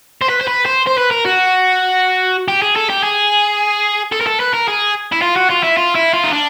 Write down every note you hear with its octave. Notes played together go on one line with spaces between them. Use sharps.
C5
B4
C5
B4
C5
C5
B4
A#4
F#4
G4
G#4
A4
G4
G#4
A4
A#4
A4
B4
A#4
G#4
E4
F4
F#4
F4
E4
F4
E4
F4
D#4
D4